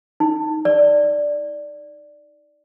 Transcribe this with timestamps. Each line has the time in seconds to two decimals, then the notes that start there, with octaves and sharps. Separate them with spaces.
0.20 D#4
0.65 D5